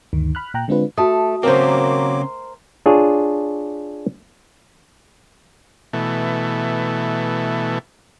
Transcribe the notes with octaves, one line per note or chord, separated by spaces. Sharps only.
D2 G2 D#3
B5 F6 F#6
A#2 G5 A#5 F#6
D3 G#3 C4 D4 F4 B4
A3 F#4 A5 D#6
C#3 F#3 A#3 C4 A#4 C5 D6
D4 F4 G#4 C#5
B2 E3 A3